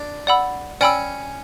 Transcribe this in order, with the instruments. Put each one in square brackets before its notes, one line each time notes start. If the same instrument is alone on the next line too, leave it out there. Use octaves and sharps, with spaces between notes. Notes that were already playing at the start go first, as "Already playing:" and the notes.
Already playing: [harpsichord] D4
[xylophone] D5 F#5 B5 E6
[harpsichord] C#4 [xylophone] D5 G5 B5 E6